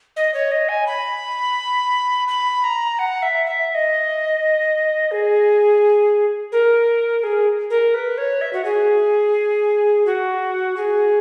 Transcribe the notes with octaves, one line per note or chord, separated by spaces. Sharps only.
D#5
C#5
D#5
G#5
B5
B5
A#5
F#5
E5
E5
E5
D#5
G#4
A#4
G#4
A#4
B4
C#5
E5
F#4
G#4
F#4
G#4